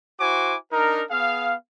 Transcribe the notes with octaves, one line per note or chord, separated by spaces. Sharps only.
E4 F#4 C5 G#5 D6
D4 D#4 A#4
B3 G#4 F5